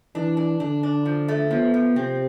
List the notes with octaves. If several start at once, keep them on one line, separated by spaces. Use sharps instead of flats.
E3 D4
D4
D3 D4
D4
F3
A3
F3 B3
F3
C3 C4